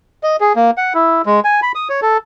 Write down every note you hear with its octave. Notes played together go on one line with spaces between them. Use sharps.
D#5
G#4
A#3
F#5
E4
G#3
G#5
B5
D#6
C#5
A4